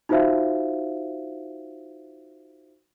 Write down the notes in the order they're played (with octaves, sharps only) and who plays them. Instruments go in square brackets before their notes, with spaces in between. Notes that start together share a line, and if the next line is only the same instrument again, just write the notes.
[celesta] D#4 F4 F#4 C5 E5 F5